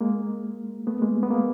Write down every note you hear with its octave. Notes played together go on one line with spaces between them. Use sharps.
G#3 A#3
A3 B3
G#3 A#3
B3
G#3 A#3